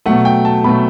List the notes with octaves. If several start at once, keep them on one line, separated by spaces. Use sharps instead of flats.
B2 F#3 A3 F#5
G5
A5
B2 F#3 A3 B5